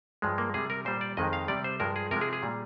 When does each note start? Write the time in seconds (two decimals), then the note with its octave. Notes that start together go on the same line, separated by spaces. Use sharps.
0.22 G2 F3 G#3
0.38 A#3
0.54 C3 G3 G#4
0.70 A#4
0.85 A#2 G3 C5
1.01 D5
1.17 F2 D#3 G#3 D#5
1.33 F5
1.48 C3 G3 D5
1.64 C5
1.80 G2 F3 G#3 A#4
1.96 G#4
2.11 C3 F3 G#3 A#4
2.21 G#4
2.33 G#4
2.43 A#2 G3